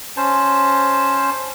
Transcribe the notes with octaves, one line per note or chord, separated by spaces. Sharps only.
C#4 C5 A5